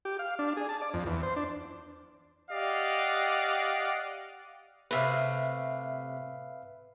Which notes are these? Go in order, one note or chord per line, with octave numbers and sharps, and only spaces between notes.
G4
F5
D4
G#4
A5
D5
F2
E2
C5
D4
G4 D5 D#5 F5 F#5
A2 C3 B4 E5 F5